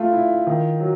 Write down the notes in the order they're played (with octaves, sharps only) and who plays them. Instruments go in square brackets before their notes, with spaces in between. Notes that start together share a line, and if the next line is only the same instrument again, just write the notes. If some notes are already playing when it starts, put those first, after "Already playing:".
Already playing: [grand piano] A3 [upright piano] F4
[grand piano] E4
D#3
F#3